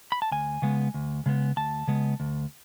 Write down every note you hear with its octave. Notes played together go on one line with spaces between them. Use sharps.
B5
A5
D2 G#5
C#3 G#3 B3
D2
C#3 G#3 B3
D2 A5
C#3 G#3 B3
D2